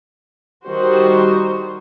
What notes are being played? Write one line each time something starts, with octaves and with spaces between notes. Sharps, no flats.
D#3 G3 F#4 C5